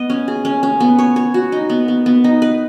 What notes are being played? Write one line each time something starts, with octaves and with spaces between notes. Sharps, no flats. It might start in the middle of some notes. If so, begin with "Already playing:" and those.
Already playing: B3 D#5
C#4
G#4
C#4
C#4
B3
C#5
C#5
F#4
D#4
B3
B3
B3
D#4
B4